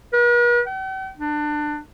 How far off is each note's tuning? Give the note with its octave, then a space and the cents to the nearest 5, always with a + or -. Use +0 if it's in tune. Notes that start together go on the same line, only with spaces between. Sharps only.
B4 -45
G5 -45
D4 +25